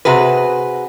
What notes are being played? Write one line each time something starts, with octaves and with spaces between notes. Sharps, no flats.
C3 F#4 G#4 B4